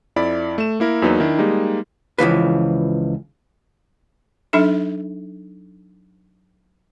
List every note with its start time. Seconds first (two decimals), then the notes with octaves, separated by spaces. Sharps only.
0.16 F2 E4 D5 B5
0.58 A3 E7
0.80 A#3 E4 A#4
1.02 E2 F#3 A#3 D#4 B4
1.20 D#3 D4 E4
1.38 G3 G#3 A#3 D#4
2.18 C#2 E3 F3 B4
4.53 F#3 D4 D#4 A4 E5